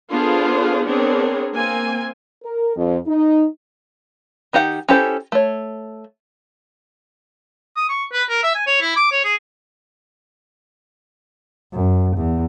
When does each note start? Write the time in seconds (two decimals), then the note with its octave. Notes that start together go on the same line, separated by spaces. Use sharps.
0.12 B3 D4 F4 G#4 A4 C5
0.87 B3 C4 D4 G#4 A#4 C#5
1.54 A#3 C4 G#5
2.44 A#4
2.76 F2
3.07 D#4
4.53 D#3 D#4 G4 F#5
4.88 C#4 E4 G4 A4 C5
5.32 A3 C#5
7.77 D#6
7.89 C#6
8.13 B4
8.29 A#4
8.44 E5
8.55 G#5
8.67 C#5
8.81 E4
8.96 D6
9.12 C#5
9.25 G#4
11.73 F#2
12.17 E2